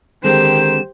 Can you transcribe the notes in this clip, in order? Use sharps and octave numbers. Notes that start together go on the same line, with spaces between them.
D3 D#3 G#3 C4 G4 C5 E7